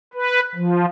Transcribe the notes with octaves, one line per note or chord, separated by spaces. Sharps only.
B4
F3